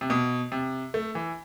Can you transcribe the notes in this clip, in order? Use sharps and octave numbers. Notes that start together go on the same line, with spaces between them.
C3
B2
C3
A3
E3